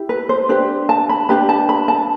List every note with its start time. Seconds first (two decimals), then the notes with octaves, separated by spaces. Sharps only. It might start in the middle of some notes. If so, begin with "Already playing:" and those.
Already playing: E4 G4
0.09 B4
0.29 C5
0.49 D4 G4 B4 C5
0.89 A5
1.09 B5
1.29 D4 G4 B4 B5
1.49 A5
1.69 B5
1.88 A5